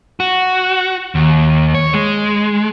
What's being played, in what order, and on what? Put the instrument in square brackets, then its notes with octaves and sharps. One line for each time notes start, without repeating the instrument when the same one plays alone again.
[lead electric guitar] F#4
D#2
C#5
G#3